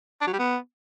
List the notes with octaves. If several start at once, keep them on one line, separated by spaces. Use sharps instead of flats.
D4
F#3
G3
B3